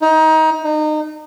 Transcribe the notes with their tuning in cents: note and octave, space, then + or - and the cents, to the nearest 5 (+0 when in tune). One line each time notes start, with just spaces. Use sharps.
D#4 +25
D#4 -30